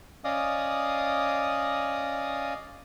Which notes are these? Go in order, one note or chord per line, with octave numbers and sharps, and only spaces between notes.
C#4 D5 D#5 F5 D#6